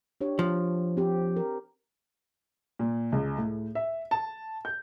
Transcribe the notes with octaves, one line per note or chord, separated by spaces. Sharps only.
D4 G4 C#5
F3
C4 G4
A#4
A#2
C#2
A2
E5
A5
G6